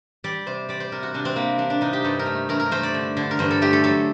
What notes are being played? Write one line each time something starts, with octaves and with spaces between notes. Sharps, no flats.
G3 D5
C3 C5
G3 D5
C5
C3 A#4
F#4
C3 D4
C4
G3 A#3
G3 D4
D4
C3 D#4
G4
G2 A4
A#4
A3
G2 A#4
A#4
A3 C5
D5
D3
D3
A#4
G2 C5
A4
A3 G4
A4
F#3 A4